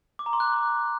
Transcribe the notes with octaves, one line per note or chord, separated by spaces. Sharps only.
D6
A#5
C6
F#6